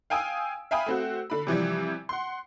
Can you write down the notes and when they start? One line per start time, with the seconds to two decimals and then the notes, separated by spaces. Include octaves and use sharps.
0.10 F5 G5 G#5 D#6 E6 D7
0.71 E5 F5 G5 G#5 B5 D#6
0.86 A3 C4 F#4
1.30 D3 B5
1.47 C3 E3 F3 G3
2.09 F#5 C6